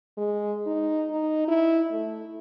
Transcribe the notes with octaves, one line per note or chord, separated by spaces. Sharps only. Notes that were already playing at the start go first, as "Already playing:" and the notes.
G#3
D#4
D#4
E4
A3